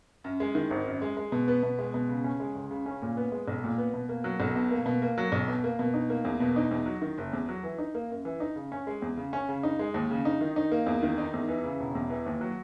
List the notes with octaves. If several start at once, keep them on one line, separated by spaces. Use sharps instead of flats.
F#2
G#3
D#3
G#1
F#2
G#3
G#3
B2
B3
B2
G#3
B2
C#3
C#4
G#3
C#2
C#3
C#4
A#2
B3
G#3
B1
A#2
B3
B2
A#3
F#3
B1
B2
A#3
B2
A#3
F#3
B1
B2
A#3
B2
D#4
A#3
E2
B2
D#4
E2
F#3
D#3
F#1
E2
F#3
E3
D#4
A#3
F#2
E3
D#4
C#3
C#4
G#3
E2
C#3
C#4
C#3
D#4
G#3
D#2
C#3
D#4
D#3
D#4
A#3
E2
D#3
D#4
E2
E3
C#3
E1
E2
E3
D#2
F#3